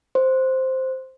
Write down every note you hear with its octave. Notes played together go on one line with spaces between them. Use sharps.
C5